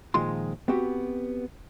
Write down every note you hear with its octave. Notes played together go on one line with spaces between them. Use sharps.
A#2 D#3 F3 G#3 F4 C6
B3 C4 F#4 G4